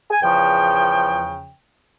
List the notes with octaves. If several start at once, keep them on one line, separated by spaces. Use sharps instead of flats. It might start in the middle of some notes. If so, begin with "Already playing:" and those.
G#5
E2 C#3 F3 G5